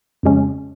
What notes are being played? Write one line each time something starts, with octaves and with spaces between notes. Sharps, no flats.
F2 C#3 G#3 C#4